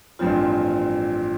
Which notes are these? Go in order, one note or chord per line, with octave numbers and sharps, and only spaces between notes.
A1 G2 F3 C4 F4